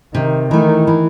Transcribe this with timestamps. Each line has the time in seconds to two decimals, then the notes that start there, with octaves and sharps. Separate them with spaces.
0.14 C3 D#3
0.51 D#3 E3 A3
0.87 E3